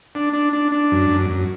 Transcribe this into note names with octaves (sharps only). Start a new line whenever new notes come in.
D4
D4
D4
D4
F#2
F#2
F#2